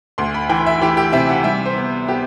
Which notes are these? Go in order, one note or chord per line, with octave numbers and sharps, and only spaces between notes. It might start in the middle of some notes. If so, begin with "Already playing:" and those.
D2 C6
B5
E3 G5
E5
E3 G4
G4
C3 E5
F#5
G3 E5
C5
B3
B3 G4